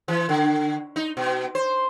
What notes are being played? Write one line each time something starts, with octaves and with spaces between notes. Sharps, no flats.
E3
D3
D#4
B2
C5